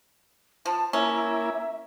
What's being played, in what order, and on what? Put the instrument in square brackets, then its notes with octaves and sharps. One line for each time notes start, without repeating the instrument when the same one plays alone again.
[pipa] F3 [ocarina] A5
[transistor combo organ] A#3 E4 [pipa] C#4 [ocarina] E5